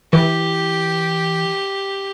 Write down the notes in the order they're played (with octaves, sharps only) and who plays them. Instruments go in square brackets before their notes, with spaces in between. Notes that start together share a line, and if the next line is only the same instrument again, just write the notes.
[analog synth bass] E3 [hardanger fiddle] G4